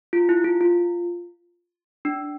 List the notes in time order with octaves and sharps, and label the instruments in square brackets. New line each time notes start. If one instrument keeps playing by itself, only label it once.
[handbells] F4
E4
F4
F4
D4